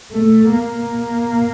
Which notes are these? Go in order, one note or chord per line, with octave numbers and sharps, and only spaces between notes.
A3
A#3